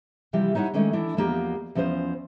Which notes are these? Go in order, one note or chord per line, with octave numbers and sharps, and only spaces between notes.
C3 E3 F3 G3 G4
D#4 E4 C#5 D#5 F#5
D#3 E3 G#3 A3 C#4 D4
E3 D4 E4
E2 F3 A#3 F#4 G4 D#5
E2 F3 C#4 B4 C5 D#5